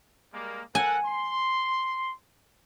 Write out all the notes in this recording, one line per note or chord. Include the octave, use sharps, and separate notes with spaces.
G3 G#3 A#3
A4 A#4 F#5 G#5
C6